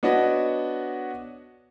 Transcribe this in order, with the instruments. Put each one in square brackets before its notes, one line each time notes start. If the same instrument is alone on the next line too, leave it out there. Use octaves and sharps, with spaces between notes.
[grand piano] B3 D4 F#4 C#5 D#5